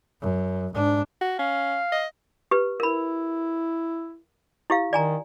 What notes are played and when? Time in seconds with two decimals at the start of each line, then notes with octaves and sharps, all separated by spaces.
0.21 F#2
0.73 G#2 D4
1.21 F#4
1.39 C#4 F5
1.92 D#5
2.51 G4 B4
2.80 E4 A#4 B5
4.70 E4 G4 F5
4.93 D#3 D5 G#5 A#5